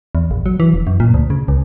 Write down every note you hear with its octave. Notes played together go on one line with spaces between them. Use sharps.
E2
A#1
F#3
E3
E1
F#2
A#2
D2
C#3
C#2